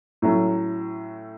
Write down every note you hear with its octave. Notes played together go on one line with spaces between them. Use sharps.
A2 F#3 A3 C#4